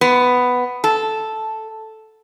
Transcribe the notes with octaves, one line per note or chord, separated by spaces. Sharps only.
B3
A4